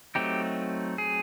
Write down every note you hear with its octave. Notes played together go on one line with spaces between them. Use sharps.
F#3 A3 C4 D#4 G4
G#4